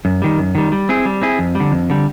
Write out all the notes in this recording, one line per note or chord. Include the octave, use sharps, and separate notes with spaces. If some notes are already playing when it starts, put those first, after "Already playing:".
F#2
D#3 G3
F#2
D#3 G3
G3
C4 E4 G#4
G3
C4 E4 G#4
F2
G3
D3
F2
D3 G3